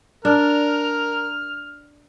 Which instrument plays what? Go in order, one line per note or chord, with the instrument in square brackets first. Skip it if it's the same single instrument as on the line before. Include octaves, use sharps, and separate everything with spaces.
[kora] D4 [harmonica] A#4 [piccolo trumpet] F6